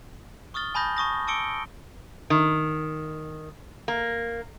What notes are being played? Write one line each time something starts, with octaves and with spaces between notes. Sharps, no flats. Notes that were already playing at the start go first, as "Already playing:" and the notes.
C#6 D#6 F6 A6 G7
G#5 A5 B5 D#6 G6 A#6
A5 C#6 D#6 A#6
A5 D6 E6 C#7 D7 G7
D#3
A#3